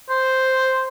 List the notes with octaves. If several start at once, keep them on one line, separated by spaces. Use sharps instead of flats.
C5